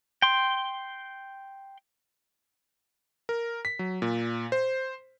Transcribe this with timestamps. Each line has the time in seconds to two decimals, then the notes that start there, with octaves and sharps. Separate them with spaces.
0.22 G5 C6
3.29 A#4
3.65 B6
3.79 F#3
4.02 A#2
4.52 C5